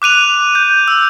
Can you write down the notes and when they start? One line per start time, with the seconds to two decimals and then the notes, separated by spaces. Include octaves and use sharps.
0.02 D6 F#6 D#7 F7
0.55 G6
0.88 E6